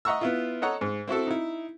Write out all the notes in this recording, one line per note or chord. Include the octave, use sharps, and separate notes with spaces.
D#5 E5 F#5 A#5 C#6 E6
B3 E4 F4
A4 C#5 D#5 F#5 A#5
G#2
C4 E4 F#4 A4
D#4 E4